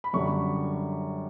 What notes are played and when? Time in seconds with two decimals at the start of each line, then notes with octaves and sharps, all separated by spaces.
0.04 B5
0.13 F#2 D3 G3 C#6